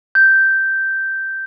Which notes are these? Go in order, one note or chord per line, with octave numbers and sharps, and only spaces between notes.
G6